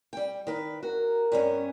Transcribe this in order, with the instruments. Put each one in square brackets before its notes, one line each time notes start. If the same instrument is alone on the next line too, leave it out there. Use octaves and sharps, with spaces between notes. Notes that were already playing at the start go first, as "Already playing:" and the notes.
[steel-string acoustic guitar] G3 G5
D#3 B4
[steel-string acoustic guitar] F#4 [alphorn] A#4
[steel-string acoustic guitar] G2 B3 C#4